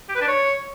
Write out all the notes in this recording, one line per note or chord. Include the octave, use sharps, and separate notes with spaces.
G4
B4
D4
C#5